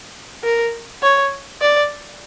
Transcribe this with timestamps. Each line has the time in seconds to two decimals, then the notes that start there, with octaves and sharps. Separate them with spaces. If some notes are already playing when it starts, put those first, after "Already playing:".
0.44 A#4
1.03 C#5
1.61 D5